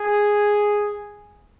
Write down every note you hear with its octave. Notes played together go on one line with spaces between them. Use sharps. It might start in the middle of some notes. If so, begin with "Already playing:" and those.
Already playing: G#4